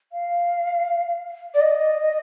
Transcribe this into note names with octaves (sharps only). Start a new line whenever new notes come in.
F5
D5
D#5